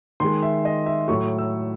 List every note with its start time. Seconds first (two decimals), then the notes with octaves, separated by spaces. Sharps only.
0.20 D#3 G#3 C6
0.42 E5
0.65 D#5
0.86 E5
1.08 A2 F#3 A3 C#6
1.38 E6